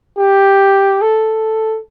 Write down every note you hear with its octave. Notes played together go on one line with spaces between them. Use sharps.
G4
A4